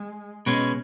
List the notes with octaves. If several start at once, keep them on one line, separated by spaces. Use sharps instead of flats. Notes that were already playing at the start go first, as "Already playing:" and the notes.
Already playing: G#3
B2 G#3 C#4